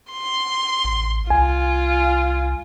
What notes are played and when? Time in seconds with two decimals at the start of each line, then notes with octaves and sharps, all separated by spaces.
0.11 C6
0.84 A1
1.30 C2 F4 G#5